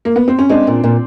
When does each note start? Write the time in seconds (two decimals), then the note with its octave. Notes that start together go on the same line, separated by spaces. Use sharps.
0.05 A#3
0.16 B3
0.28 C4
0.39 C#4
0.49 G#3 C4 D4
0.67 A#2
0.84 A#2